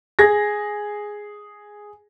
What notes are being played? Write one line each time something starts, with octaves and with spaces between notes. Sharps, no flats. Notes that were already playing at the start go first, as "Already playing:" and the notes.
G#4 G#6 A#6